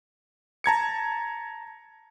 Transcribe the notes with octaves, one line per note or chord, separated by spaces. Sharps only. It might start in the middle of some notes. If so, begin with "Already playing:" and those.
A5 A#5 G#6 C#7